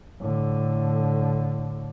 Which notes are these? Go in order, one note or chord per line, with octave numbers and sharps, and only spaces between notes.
A2 D3